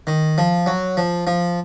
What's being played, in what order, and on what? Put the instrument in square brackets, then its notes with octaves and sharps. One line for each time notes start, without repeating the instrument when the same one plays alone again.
[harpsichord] D#3
F3
F#3
F3
F3